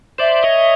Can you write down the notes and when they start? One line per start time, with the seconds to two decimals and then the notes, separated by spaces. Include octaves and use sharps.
0.18 C5 D5 E5
0.43 C#5 D#5